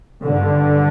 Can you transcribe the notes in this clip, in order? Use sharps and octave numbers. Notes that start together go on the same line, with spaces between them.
G2 D3